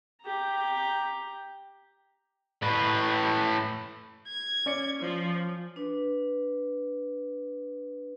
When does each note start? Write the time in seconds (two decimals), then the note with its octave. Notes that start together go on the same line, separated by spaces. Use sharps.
0.23 G4 A#5
2.63 A2 B4
4.28 G#6
4.66 C#4 D5 C#7
5.00 F3
5.76 D4 B4